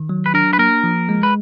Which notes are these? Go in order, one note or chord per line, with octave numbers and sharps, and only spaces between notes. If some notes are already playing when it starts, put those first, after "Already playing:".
Already playing: D#3
F#3
B4
D4 A#4
B4
A#3 A#4
F3
G#3
B4